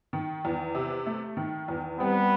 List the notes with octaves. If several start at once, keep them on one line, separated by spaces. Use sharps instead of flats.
D#3
E2
C3
A3
D#3
E2
G3 B3 C4